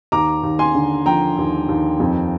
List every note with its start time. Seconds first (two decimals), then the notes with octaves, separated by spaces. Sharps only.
0.12 D#2 A#5 D6
0.43 D#2
0.59 G#5 C6
0.75 D3
1.06 F3 G5 A#5
1.37 D#2
1.69 D#2
2.00 F2